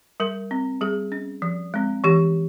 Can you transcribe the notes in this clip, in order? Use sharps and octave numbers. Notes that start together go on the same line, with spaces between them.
G3 A#4
C4
G3 G#4
C#4
F3
G#3 C4
E3 G4